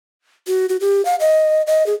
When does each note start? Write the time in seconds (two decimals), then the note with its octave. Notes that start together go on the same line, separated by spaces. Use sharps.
0.47 F#4
0.69 F#4
0.81 G4
1.05 F5
1.20 D#5
1.67 D#5
1.87 G#4